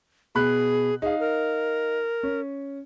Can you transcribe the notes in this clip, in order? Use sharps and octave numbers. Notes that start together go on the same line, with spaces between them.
B2 G#4 B5 F#6
D#4 G#4 F5
A#4
C#4